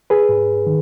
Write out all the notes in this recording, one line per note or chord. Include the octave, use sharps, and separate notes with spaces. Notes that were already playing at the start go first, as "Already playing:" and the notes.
G#4 B4
G#2
D#3